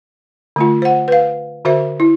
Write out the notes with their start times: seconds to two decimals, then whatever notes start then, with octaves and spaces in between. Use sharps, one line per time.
0.56 D3 A3 F4
0.82 C5 F#5
1.08 B4 F5
1.65 D3 F#4 A#4 C5 E5
2.00 E4